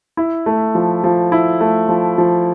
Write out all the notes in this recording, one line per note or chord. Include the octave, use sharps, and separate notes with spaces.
E4
A3
F3
F3
E4
A3
F3
F3